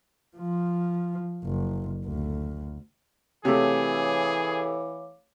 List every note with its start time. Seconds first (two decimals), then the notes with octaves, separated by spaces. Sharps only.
0.37 F3
1.44 F#1
2.05 D2
3.45 C3 E3 A3 G#4 C#5 F5 D6